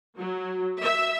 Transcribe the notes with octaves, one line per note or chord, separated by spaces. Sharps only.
F#3
E5